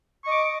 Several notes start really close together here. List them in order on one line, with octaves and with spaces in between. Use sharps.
C#6 D#5 D6